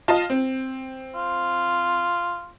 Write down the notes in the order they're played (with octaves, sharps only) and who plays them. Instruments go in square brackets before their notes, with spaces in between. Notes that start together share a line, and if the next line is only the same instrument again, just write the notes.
[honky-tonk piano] F4 D#5 A5
C4
[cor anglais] F4